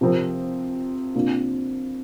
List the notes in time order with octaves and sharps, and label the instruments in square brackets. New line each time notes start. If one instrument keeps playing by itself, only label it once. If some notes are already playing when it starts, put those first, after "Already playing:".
[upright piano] C3 F3 C4 A#4
C3 A#3 D4 F4